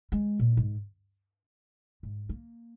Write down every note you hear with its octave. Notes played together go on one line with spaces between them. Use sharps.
G#3
A#2
G#2
G#2
A#3